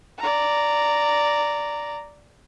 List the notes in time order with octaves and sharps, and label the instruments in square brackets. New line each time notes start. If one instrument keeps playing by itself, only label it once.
[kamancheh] D5 A#5